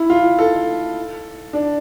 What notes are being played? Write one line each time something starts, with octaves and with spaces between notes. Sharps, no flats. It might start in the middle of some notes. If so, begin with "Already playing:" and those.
Already playing: E4
F4
A4
D4